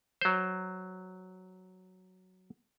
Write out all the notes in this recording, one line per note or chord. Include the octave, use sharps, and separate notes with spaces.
F#3 C5